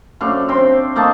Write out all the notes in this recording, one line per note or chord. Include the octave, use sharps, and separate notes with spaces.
F#2 A3 D4 F5
C4 G5 C6
A3 A#3 D#4 A5